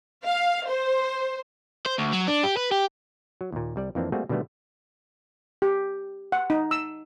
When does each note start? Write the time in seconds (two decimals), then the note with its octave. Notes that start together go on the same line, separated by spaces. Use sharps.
0.24 F5
0.67 C5
1.86 C5
1.98 D2
2.13 F#3
2.28 D4
2.43 G4
2.57 B4
2.71 G4
3.41 F#3
3.52 D#2 A#2
3.76 C2 G3 D5
3.95 F2 E3 A#3 C4 D4
4.12 G3 A3 A#3 C4 F#4 G#4
4.29 B2 D3 D#3 G3 A3 B3
5.62 G4
6.32 F#5
6.50 D#4
6.71 E6